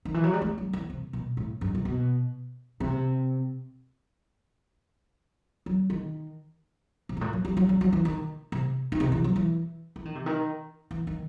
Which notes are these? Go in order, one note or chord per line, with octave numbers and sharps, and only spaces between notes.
D#3
E3
F#3
G3
A3
G3
E3
C3
B2
A2
G2
C3
B2
C3
F#3
D#3
C3
G2
A2
F#3
G3
F#3
G3
F#3
E3
D#3
C3
D#3
C3
E3
F#3
E3
E3
D#3
C3
D#3
E3
D#3